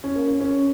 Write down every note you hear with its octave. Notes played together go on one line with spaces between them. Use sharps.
C#4
A#3
C#4
C#4